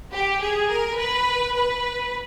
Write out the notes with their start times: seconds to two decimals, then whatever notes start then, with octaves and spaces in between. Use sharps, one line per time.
0.12 G4
0.41 G#4
0.70 A#4
0.98 B4
1.55 B4